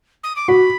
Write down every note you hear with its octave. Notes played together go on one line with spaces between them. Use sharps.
D#6
D6
F#4 B5